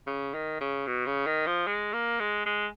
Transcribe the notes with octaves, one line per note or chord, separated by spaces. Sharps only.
C#3
D#3
C#3
B2
C#3
D#3
F3
G#3
A#3
G#3
G#3